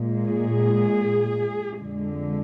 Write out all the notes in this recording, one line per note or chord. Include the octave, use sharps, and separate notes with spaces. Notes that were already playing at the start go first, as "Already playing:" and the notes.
Already playing: A#2 G#3
G#4
F2 D3 G#3